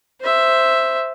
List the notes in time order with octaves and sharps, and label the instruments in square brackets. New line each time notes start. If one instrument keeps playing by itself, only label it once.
[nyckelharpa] C5 E5